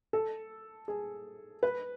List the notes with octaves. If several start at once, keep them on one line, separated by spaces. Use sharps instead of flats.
A4
G#4
B4